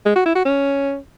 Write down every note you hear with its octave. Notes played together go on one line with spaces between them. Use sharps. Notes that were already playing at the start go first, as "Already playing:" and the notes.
G#3
F#4
E4
F#4
C#4